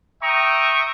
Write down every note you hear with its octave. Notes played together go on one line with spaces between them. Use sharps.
E5 G5 A#5 C#6 D#6